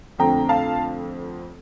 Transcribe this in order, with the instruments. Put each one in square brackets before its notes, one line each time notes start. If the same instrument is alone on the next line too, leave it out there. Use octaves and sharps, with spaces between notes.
[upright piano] F2 D3 A3 C4 G5 A#5
F5 A5